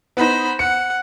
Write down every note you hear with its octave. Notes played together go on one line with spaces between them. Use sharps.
B3 D#4 C5 B5
F#5 C#7